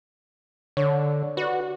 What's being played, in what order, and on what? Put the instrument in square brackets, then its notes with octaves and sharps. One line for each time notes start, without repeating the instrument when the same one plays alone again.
[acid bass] D3 [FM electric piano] C#5
[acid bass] F#4 [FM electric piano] B4 D5